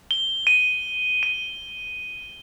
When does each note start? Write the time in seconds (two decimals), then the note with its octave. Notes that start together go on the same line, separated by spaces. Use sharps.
0.11 G7
0.47 D#7
1.23 D#7